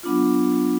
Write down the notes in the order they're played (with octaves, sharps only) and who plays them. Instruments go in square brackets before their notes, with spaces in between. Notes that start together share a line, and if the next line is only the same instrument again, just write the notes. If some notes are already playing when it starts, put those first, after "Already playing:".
[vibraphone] F#3 B3 D4 F4